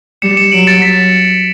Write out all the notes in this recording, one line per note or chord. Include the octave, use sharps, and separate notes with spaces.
G3 C#7 E7
C#7 E7
F#3 D7 F#7
A6 C#7
B6